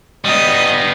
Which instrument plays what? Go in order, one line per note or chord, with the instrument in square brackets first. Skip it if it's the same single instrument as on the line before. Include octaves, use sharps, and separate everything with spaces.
[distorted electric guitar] G3 B3 [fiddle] D#5